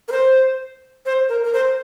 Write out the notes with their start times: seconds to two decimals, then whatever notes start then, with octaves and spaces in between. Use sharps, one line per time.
0.08 A#4
0.12 C5
1.06 C5
1.29 A#4
1.44 A#4
1.54 C5